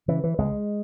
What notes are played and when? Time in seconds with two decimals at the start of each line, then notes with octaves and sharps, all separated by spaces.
0.08 C#3 E3
0.24 E3
0.38 C#2 G#3